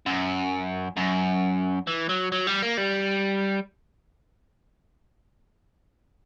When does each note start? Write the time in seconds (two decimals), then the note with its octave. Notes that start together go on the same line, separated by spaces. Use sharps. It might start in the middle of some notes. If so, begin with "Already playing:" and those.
0.06 F#2
0.97 F#2
1.87 E3
2.09 F#3
2.32 F#3
2.47 G3
2.62 A#3
2.78 G3